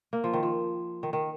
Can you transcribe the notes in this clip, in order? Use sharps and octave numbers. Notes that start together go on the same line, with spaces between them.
A#3
F3
D#3
F3
D#3
D#3